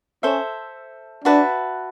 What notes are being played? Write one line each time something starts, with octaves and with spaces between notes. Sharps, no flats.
C#4 A4 C5 E5
D4 F#4 B4 E5 A5